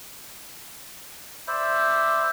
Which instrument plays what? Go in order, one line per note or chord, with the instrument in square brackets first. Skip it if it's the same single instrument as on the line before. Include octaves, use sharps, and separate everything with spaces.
[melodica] C5 D5 E5 B5